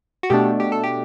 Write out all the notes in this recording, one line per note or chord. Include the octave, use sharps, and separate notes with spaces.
F#4
B2 A3 D4 G4
G4
A4
G4